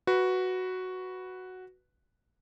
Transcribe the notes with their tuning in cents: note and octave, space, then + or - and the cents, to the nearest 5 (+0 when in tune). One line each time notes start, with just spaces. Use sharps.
F#4 +0 B4 +0